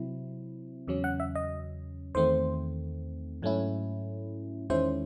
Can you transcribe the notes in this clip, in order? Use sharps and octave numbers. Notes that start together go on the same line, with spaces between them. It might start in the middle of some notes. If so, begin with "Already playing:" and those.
Already playing: C3 F#3 C4 E4
E2 C#3 F#3 C#4
F#5
E5
D#5
E2 D#3 A3 C4 C5
G#2 F#3 A3 C#4 E4
E2 D#3 G#3 C#4 E4 C5